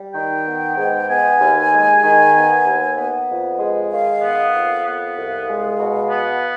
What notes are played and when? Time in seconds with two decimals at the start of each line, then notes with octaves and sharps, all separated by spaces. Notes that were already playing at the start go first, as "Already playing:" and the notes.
Already playing: G3
0.14 D#3 G5
0.47 B3
0.77 G#2
1.09 B3 G#5
1.41 D#2
1.72 G#3
2.03 D#3
2.34 B3
2.66 D#2
2.97 B3
3.29 F2
3.59 G#3
3.91 D#3 F5
4.23 B3
4.53 F2
4.85 B3 F5
5.16 C2
5.48 G#3
5.79 B2
6.11 B3